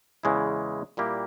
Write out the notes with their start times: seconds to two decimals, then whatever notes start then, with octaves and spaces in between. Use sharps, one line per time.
0.23 E2 C#3 E3 G#3 E4
0.97 A#2 G3 A#3 E4 G4